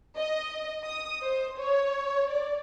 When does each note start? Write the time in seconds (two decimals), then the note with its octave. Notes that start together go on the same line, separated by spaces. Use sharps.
0.18 D#5
0.83 D#6
1.23 C5
1.59 C#5
2.31 D5